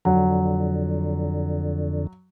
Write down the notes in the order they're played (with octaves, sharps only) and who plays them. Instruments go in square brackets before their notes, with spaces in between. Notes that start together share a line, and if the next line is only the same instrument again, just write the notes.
[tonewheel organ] F2 D3 [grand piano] F#3